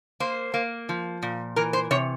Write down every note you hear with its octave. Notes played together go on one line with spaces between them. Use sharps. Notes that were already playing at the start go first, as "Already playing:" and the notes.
A#3 C5
A#3
F3
A#2
E3 A#4
C5
C3 C#5